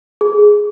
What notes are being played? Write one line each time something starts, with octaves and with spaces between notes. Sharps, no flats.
G#4